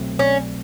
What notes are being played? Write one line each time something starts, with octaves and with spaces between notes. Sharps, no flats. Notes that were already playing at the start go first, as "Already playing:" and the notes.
Already playing: C2 B2 F#3 A3 C4
C#4